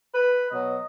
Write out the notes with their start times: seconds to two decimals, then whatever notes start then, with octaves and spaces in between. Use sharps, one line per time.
0.14 B4
0.50 B2 F#3 D#5